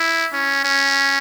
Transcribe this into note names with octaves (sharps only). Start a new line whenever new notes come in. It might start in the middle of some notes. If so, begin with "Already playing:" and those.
Already playing: E4
C#4
C#4